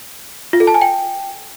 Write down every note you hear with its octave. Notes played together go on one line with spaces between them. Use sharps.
F4
A4
A5
G#5
G5